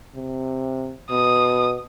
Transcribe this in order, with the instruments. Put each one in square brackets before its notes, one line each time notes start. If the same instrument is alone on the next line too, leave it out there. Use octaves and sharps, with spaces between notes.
[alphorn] C3
[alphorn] B2 [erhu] D#6